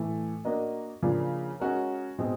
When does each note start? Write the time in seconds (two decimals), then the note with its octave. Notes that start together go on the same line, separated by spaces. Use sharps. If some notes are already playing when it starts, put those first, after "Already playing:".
Already playing: A2 E3 A3
0.45 A#3 D4 F#4 A#4 D#5
1.03 C#3 F3 A#3 D4 F4
1.60 G#3 C#4 F#4 A#4
2.18 B2 G#3 C4